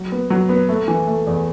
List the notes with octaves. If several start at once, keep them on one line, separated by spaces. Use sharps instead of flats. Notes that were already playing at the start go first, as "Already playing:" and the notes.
Already playing: F#3
B3
F#3
B3
A3
E3
A3
E2